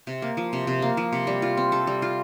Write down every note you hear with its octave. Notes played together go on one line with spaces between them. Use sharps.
C3
A#3
F3
C3
C3
A#3
F3
C3
G3
F4
C4
A4
G3
F4